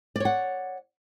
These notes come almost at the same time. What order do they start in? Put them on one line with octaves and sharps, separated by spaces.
D5 C#5 F#5